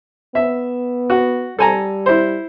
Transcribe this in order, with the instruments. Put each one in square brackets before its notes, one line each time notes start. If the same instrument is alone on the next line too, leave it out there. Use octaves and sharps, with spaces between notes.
[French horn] B3 [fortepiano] E5
[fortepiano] F#4
[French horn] G3 [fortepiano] A4 G#5 A#5
[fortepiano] E4 C5